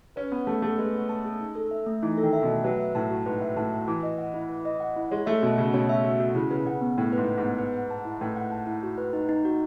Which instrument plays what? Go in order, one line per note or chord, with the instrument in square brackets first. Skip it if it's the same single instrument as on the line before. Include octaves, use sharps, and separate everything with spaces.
[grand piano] C#4 [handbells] B4
[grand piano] B3 [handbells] F#5
[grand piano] A3 [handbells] A5
[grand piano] A3 [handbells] G#4
[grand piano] G#3 [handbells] B4
[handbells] F#5
A5
G#4
D#4
A4
E5
A3
[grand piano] E3 [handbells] D#4
[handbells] A4
[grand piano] D#3
[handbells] E5
[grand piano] B2
[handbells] A3
[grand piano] F#3 [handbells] B4
[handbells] E5
[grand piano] A2 [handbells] A5
[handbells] F#4
[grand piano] G#2 [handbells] B4
[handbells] E5
[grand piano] A2 [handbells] A5
[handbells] F#4
[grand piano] E3 [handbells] B4
[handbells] D#5
F#5
E4
B4
D#5
F#5
E4
[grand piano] G#3 [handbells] C#5
[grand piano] A3 [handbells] E5
[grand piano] B2 [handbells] F#4
[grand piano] C#3 [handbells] F#4
[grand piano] B2 [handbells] C#5
[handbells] E5
F#4
F#4
[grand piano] C#3 [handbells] E4
[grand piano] C#3 [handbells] B4
[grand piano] C#3 [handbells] F#5
[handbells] B3
[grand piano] A2 [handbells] E4
[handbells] B4
[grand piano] G#2
[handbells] F#5
[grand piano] G#2
[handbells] B3
B4
F#5
A5
E4
[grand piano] A2 [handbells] B4
[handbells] F#5
A5
E4
F#4
B4
D#4
D#4
F#4